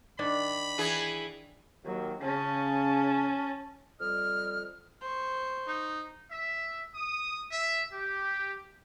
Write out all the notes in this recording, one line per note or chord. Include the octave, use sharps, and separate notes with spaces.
D#3 D4 B5
E3 G#4
D#2 F#3
C#3 C#4 A5
F2 G3 D#5 F6
C5 C#6
D#4
E5
D#6
E5
G4